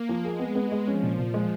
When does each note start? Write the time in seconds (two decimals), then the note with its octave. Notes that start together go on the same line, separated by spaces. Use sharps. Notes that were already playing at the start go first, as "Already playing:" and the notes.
Already playing: A#3
0.09 F3
0.24 G#3 G#4
0.39 B3
0.55 B3
0.72 G#3
0.87 F3 C#4
1.03 A#2
1.18 A#2 F3
1.34 G#3